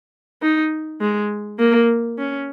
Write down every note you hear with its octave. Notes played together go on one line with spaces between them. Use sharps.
D#4
G#3
A#3
C#4